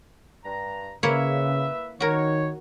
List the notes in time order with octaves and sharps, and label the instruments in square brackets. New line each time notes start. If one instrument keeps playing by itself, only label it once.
[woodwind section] G2 A#5
[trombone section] C#3 [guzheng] A#3 E4 C#5 [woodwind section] B4 E5
[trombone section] D#3 [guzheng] F#4 A#4 [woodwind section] C#5